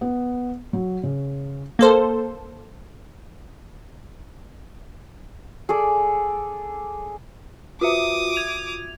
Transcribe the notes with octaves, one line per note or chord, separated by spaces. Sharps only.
B3
F#3
C#3
A#3 A4 C5
G#4 A4 D5
F4 F#4 E5 D6 D#6
G#6 F7